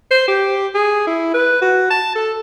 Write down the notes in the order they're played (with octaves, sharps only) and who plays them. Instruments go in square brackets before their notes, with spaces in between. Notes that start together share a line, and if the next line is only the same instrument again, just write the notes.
[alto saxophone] C5
G4
G#4
E4
B4
F#4
A5
A4